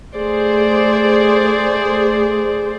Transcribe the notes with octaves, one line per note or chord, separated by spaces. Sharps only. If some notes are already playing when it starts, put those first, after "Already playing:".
A3 G#4 C5 D5